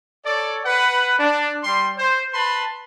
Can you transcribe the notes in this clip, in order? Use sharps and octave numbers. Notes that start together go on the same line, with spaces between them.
A4 C#5 D5
B4 F#5
D4
G3 C6
C5
B4 A5 B5 C6